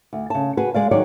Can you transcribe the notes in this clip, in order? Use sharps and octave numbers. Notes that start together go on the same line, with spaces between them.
D2
C#3 A5
F#4 G#4 B4
G#3 D5 F5
D#3 F#3 G#3 C#5 D5